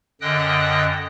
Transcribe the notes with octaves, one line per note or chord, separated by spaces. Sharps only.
F#2 D3 D#5 G5 D#6 F#6